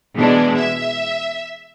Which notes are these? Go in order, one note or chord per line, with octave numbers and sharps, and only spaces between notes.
B2 E3 G#3 D4
E5